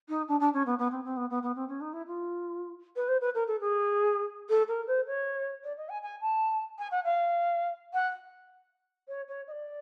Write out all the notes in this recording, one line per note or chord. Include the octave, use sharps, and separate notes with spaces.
D#4
D4
D4
C#4
B3
B3
C4
C4
B3
B3
B3
C4
C#4
D#4
E4
F4
B4
C5
B4
A#4
A4
G#4
A4
A#4
C5
C#5
D5
D#5
G#5
G#5
A5
G#5
F#5
F5
F#5
C#5
C#5
D#5
D5